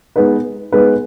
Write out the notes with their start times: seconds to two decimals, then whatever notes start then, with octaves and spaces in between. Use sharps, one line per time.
0.16 G#3 B3 D#4 B4
0.72 G#3 B3 D#4 B4